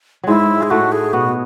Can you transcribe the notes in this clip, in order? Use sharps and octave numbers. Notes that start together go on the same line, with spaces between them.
G#2 F#3 G#3 E4
G#3 G#4
A2 A3 F#4
G#4
B2 B3 F#4